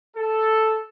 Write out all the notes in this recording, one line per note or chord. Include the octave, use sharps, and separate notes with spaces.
A4